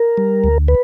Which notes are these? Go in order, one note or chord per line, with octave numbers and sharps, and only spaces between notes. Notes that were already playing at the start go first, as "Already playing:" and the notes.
Already playing: A#4
G3
D2
B4